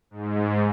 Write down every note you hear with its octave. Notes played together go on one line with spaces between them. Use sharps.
G#2